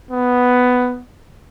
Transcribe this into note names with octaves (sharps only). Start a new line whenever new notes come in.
B3